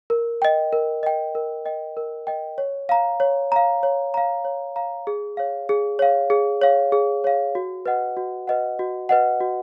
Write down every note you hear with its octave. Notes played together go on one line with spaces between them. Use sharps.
A#4
D#5 G5
A#4
D#5 G5
A#4
D#5 G5
A#4
D#5 G5
C#5
F5 A#5
C#5
F5 A#5
C#5
F5 A#5
C#5
F5 A#5
G#4
C#5 F5
G#4
C#5 F5
G#4
C#5 F5
G#4
C#5 F5
F#4
B4 D#5 F#5
F#4
B4 D#5 F#5
F#4
B4 D#5 F#5
F#4